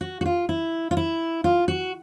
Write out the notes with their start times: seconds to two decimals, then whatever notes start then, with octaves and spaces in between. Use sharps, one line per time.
0.01 F#4
0.21 F#4
0.26 F4
0.49 E4
0.91 F4
0.97 E4
1.44 F4
1.68 F#4